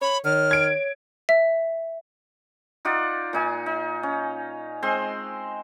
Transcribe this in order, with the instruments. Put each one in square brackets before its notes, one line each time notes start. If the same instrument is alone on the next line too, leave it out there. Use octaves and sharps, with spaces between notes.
[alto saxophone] C#5 [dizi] B5
[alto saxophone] D#3 [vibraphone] C#5 [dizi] F6
[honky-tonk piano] G#6 D7
[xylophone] E5
[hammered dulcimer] D#4 F4 D5 F#5
A#2 D#4 G#5
D#4
C#4
G#3 C4 C5 C6